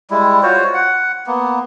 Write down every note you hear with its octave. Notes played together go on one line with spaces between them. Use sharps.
G3 G#3 E4
F4 F#4 C5 C#5
F#5
A#3 B3